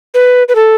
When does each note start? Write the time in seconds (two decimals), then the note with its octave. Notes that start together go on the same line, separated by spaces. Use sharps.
0.14 B4
0.49 B4
0.55 A4